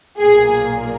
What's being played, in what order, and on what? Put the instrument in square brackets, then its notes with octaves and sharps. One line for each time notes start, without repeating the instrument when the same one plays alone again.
[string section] B1 A#2 A#3 G#4